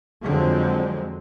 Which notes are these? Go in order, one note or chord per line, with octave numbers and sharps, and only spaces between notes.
F2 D3 F3 F#3 G#3 C4